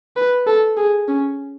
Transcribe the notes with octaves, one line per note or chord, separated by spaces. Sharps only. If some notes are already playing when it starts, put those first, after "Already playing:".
B4
A4
G#4
C#4